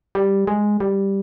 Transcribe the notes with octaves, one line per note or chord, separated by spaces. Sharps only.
G3
G#3
G3